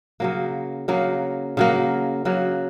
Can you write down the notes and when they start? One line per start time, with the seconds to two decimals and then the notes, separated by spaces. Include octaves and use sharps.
0.20 C#3 F#3 A#3
0.88 C#3 F#3 A#3
1.57 C#3 F#3 A#3
2.25 C#3 F#3 A#3